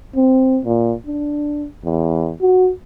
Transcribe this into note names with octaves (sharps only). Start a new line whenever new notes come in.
C4
A#2
D4
E2
F#4